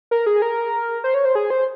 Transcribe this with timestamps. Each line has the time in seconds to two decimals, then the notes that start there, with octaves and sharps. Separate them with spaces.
0.11 A#4
0.26 G#4
0.42 A#4
1.04 C5
1.14 C#5
1.25 C5
1.35 G#4
1.50 C5